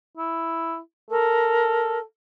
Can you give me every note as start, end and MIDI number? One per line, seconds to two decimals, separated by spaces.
0.17 0.79 64
1.11 2.02 69
1.11 1.99 70